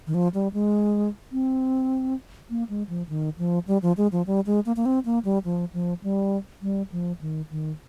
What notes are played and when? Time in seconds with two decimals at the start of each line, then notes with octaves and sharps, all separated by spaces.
0.07 D#3
0.14 F3
0.34 G3
0.53 G#3
1.32 C4
2.50 A#3
2.69 G#3
2.89 F3
3.09 D#3
3.38 F3
3.68 G3
3.82 F3
3.97 G#3
4.12 F3
4.27 G3
4.46 G#3
4.66 A#3
4.76 A#3
4.86 C4
5.05 A#3
5.25 G3
5.45 F3
5.73 F3
6.04 G3
6.62 G3
6.92 F3
7.21 D#3
7.51 D#3